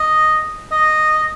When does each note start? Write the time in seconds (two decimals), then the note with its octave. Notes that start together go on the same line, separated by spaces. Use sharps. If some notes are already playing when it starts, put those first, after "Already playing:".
Already playing: D#5
0.72 D#5